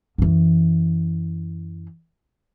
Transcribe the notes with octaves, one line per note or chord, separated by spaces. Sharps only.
F#2 E3